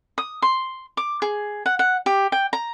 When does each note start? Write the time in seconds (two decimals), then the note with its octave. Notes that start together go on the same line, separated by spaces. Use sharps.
0.18 D#6
0.42 C6
0.97 D6
1.22 G#4
1.66 F#5
1.79 F#5
2.06 G4
2.32 G5
2.53 A#5